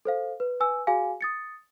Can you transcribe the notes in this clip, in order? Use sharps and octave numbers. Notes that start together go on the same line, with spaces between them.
A4 C5 F5
B4
B4 G#5 E6
F#4 G#4 F5 G#5
D#6 A6 C#7